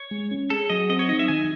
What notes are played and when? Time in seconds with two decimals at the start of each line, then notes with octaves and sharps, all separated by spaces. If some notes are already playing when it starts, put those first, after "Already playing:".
Already playing: C#5
0.11 G#3
0.31 C#4
0.50 G#4 A4
0.70 F#3 D#5
0.89 C4 D#5
0.99 C#5
1.09 D#4 D#5
1.19 E5
1.28 D#3 G#5